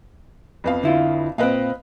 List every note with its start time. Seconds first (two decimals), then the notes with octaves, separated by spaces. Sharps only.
0.64 F2 B3 F5
0.83 D3 E4 F4
1.38 A#2 C4 B4 D#5 F5